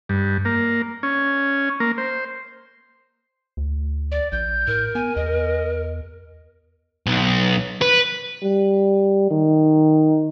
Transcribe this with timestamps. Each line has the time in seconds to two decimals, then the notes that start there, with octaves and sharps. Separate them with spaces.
0.09 G2
0.45 A#3
1.03 C#4
1.80 A#3
1.98 C5
3.57 D2
4.12 D5
4.32 A#1 G6
4.67 A2 A#4
4.95 B3 G#5
5.16 E2 D#5
7.06 B1
7.82 B4
8.43 G3
9.31 D#3